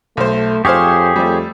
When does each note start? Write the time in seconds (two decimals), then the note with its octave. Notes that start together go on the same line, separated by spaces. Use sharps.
0.17 B1 A3 C5
0.65 F2 G4 G#4 C5 C#5 F5 C#6
1.16 F2 G3 A3